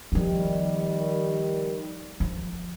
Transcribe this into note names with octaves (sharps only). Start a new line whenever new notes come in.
D#3 F3 G3 B3
F3